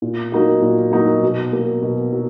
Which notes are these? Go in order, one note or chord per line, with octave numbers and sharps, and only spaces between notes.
A#2
F#3 A#3 D#4 F#4
A#2
F#3 A#3 D#4 F#4
B2
F#3 A#3
B2
F#3